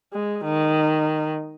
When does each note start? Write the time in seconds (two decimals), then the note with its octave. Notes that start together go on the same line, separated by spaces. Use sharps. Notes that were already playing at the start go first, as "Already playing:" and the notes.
0.13 G#3
0.44 D#3